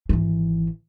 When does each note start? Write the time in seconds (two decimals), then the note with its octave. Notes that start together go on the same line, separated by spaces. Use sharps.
0.09 G#1 E3